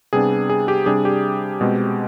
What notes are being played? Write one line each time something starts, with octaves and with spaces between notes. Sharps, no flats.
C3 G3 B3 D4 G#4
G#4
G4
C3 G3 D4 G#4
G4
B2 G#3 C4